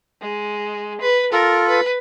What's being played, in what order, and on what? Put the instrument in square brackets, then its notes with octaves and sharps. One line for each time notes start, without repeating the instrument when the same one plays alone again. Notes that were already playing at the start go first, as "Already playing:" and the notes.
[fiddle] G#3
B4
[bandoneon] F4 A4 [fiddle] A#4
[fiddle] B4